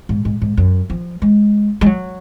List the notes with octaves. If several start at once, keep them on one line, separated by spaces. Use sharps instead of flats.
G#2
G#2
G#2
F#2
F3
G#3
G#3
F#3